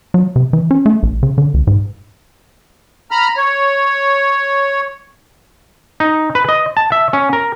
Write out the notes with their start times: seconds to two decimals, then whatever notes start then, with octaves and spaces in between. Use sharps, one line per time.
0.14 F#3
0.36 C3
0.53 E3
0.71 C#4
0.86 A3
1.03 A#1
1.23 C#3
1.38 D3
1.54 C#2
1.67 G#2
3.11 A#5 B5 F6
3.37 C#5
6.00 D#4
6.35 B4
6.49 D#5
6.77 A5
6.92 E5
7.13 C#4
7.33 A#4